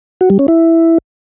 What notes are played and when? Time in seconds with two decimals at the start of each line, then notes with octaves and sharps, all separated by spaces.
0.21 F#4
0.30 G3
0.39 C#4
0.48 E4